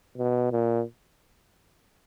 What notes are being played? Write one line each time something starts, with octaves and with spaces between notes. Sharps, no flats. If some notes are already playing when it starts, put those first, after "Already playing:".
B2
A#2